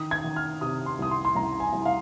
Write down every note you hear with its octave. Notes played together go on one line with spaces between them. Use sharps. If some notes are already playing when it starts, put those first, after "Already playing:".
Already playing: D#3 D#6
G#6
D#3
F6
C3 D#6
C6
C2 D#6
C6
C6
C2 A#5
G#5
C2
F5